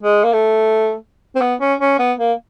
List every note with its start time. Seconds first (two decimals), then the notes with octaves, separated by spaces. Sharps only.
0.03 G#3
0.24 A#3
0.33 A3
1.35 C4
1.41 B3
1.61 C#4
1.80 C#4
1.99 B3
2.19 A#3